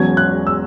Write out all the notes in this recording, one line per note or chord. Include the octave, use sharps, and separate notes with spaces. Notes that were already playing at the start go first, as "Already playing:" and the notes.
Already playing: E1 E2 B2 F#3 C#4 G#6
F#6
E6